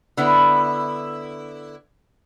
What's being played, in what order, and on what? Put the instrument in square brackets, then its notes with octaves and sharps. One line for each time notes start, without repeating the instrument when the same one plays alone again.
[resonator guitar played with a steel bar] D3 B3 E4